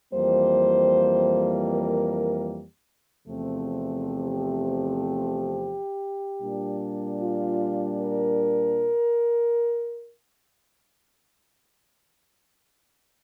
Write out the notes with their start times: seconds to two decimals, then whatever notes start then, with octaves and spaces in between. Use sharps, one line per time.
0.13 F2 E3 G3 A#3 C5
1.71 A#4
3.27 E2 C3 F3 A3 C4
4.06 G4
6.42 A#2 G3 D4
7.20 F4
7.99 A#4